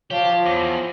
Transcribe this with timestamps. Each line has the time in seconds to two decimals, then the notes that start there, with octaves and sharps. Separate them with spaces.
0.11 F3 G4 C#5 F5 A5
0.46 E2 D6 A#6